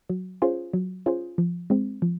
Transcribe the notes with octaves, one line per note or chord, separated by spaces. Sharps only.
F#3
C#4 F4 G#4 C5
F#3
C#4 F4 G#4 C5
F3
G#3 C4
F3